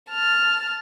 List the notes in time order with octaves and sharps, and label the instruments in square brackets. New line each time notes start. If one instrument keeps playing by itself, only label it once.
[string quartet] A5 F6